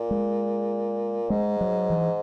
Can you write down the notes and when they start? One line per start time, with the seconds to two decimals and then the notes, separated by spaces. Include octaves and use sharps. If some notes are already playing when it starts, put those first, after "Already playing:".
Already playing: A#2
0.11 G#3
1.30 G#2 G#3
1.61 F#3
1.90 E3